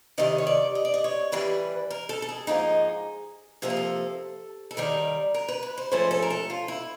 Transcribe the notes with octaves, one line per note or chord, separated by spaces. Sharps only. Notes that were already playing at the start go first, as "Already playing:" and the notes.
C3 D#3 G3 D#5
C#5
D5
D#5
D5
D#5
C#5
A2 E3 G3 B4
A#4
A4
A4
G#4
G#2 F3 A#3 D#4
C3 F3 A#3 A4
G#4
A4
A4
D#2 D#3 G3 A#4
A#4
B4
B4
C5
G#2 F3 A3 C#4 C5
A4
A#4
A4
F4
E4